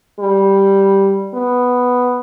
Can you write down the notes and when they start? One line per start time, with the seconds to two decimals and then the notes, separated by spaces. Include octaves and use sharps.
0.20 G3
1.34 B3